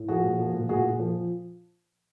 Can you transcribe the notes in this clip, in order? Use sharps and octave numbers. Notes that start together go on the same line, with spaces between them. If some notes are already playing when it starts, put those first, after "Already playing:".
Already playing: A2
F3 F#4 G#4
A#2
F3
A#2
A#2 F#4 G#4
A#2
F3